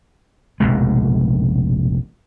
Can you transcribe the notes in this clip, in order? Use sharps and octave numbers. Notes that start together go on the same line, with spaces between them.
F1 A#1 B2 G#3